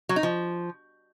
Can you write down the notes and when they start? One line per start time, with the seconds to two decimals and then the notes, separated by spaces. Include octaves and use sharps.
0.09 F#3
0.16 D#4
0.23 F3